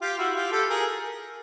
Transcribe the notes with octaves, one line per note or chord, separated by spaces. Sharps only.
F4 G4
E4 F#4
F4 G4
G4 A4
G#4 A#4